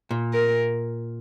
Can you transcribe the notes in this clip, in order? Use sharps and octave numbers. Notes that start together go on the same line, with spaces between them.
A#2
A#4